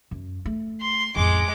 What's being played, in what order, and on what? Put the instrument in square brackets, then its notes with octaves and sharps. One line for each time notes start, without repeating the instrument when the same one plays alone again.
[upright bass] F#2
A3
[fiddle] C6
[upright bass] A1 F2 [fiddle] G#3 D6